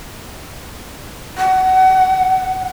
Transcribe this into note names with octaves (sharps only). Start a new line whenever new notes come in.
F#5